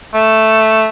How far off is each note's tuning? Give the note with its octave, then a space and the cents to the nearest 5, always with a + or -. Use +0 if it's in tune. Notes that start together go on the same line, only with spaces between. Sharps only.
A3 +0